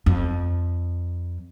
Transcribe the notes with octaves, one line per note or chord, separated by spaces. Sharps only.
F2